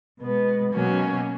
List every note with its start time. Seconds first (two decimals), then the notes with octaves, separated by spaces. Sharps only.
0.20 B2 G#3 B3
0.73 B2 F#3 A#3 C#4 F#4